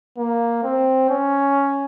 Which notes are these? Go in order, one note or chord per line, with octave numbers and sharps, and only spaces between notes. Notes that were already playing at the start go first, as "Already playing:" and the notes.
A#3
C4
C#4